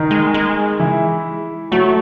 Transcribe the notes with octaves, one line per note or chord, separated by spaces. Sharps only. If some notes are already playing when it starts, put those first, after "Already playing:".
Already playing: D#3 D#4
G#3
G#3
E3 E4
F#3 A3 F#4